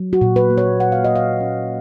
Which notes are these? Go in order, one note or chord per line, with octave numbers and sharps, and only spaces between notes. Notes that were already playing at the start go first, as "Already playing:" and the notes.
Already playing: F#3
F#4
A#2
B4
A#3
C#5
F#3 F#5
F5
D#5
A#3
F5
C#4